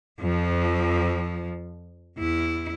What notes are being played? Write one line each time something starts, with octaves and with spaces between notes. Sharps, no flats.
F2 F3
E2 E4